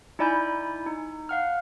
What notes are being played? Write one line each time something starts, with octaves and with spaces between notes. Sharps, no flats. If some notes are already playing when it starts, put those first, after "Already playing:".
D#4 E4 D5 G#5 B5 G6
D#4
F5 F#5 F6